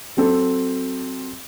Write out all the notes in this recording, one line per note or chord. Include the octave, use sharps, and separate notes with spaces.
F#3 C4 A4